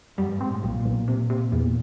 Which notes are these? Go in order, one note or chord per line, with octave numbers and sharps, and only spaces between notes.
F#2 G3
G2
G#2 C4
A2
B1 A#2
B1
C3
C3
E2